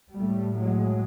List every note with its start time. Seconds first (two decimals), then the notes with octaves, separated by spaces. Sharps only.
0.15 A2 G3 A3
0.57 F#3 G#3